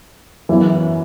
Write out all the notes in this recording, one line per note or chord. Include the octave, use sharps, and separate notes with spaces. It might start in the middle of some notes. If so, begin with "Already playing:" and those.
F#2 E3 B3 E4